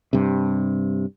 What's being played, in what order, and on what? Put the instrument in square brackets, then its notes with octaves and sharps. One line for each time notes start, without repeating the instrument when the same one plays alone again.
[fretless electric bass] G2 C3